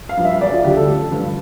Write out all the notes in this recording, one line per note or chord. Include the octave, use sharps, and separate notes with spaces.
F5
G2 F3
E5
E1 D5
F4
D2 D3 G3 G4
A4
A1
G2 D3 F3